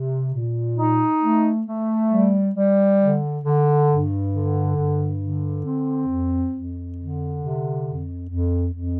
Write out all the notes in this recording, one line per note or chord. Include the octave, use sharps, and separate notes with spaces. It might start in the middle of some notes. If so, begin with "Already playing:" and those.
Already playing: C3
A#2
D#4
A3
A3
G3
G3
D3
D3
G2
D3
G2
D3
C4
F2
F2
D3
C3
F2
F2
F2